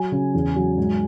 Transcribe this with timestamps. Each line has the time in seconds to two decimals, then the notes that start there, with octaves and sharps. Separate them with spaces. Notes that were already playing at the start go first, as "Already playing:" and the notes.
Already playing: F#3 G#5
0.12 C#3
0.34 E2
0.56 F#3
0.77 G#2